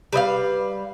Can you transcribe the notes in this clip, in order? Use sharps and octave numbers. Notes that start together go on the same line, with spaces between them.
G3 B4 D#5 F5